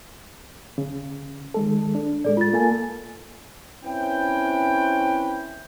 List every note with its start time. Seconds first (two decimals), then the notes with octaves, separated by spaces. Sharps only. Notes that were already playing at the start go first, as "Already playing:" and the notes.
0.78 C#3
1.54 D#3 G#3 A4
1.95 D4
2.24 A2 G#3 A4 D5
2.37 F4 A6
2.53 A#3 A4 G#5
3.84 C4 C#4 E4 B4 G5